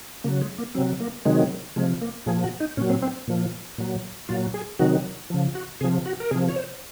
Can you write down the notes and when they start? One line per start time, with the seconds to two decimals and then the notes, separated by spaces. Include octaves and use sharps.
0.24 C#3 F#3 A#3
0.41 G#3
0.58 A#3
0.75 C3 F#3 C4
1.00 A#3
1.25 C3 D#3 F#3 G#3
1.76 C3 F3 G#3
2.02 A#3
2.26 A#2 F3 G#4
2.44 F#4
2.60 D#4
2.77 A#2 F#3 C#4
2.90 C4
3.02 C4
3.27 A#2 F3
3.78 A#2 F#3
4.29 A#2 F#3 F4
4.54 G#4
4.79 C3 D#3 F#3 F#4
5.30 C#3 F3
5.55 F#4
5.81 C3 G#4
5.84 F3
6.06 F#4
6.20 A#4
6.31 C3 F3 G#4
6.48 C#5
6.56 C5